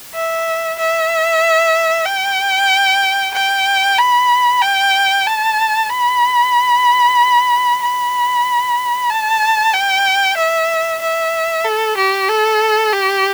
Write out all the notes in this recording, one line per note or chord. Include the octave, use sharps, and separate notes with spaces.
E5
E5
G5
G5
B5
G5
A5
B5
B5
A5
G5
E5
E5
A4
G4
A4
G4